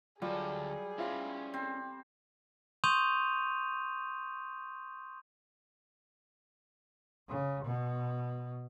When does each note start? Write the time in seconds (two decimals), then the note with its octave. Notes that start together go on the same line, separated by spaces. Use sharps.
0.22 D2 F#3 G3 F4 G#4 A4
0.98 C#4 E4 F4 C5 F5
1.54 C4
2.84 C6 C#6 D#6 G6 D#7 F7
7.28 C#3
7.65 B2